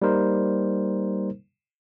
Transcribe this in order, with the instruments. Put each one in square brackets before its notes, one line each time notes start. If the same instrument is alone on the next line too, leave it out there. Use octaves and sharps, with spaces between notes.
[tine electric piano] G3 A#3 D#4 A#4 C5